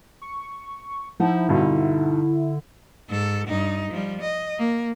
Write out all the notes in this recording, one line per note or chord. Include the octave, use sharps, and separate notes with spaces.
C#6
F3 D#4 E4 F#5 A5
G2 B2 D3
G#2 A4
G2 D#4
F3 G3
D#5
A#3